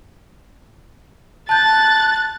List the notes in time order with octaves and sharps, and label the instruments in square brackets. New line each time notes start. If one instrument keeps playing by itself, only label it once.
[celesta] A5 G6 [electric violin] F#6 A6